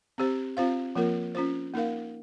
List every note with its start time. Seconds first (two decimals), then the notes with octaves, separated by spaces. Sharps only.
0.18 C4 G4 C5
0.57 C4 F4 C5 F5
0.95 F3 A#3 F4 A#4
1.35 C#4 F4 C5
1.74 A#3 D#4 A#4 F5